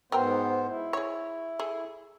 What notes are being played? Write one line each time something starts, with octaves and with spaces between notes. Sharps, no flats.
G#2 F#3 B3 A#4 C5 G5
E4
G#4 C#5
G#4 A4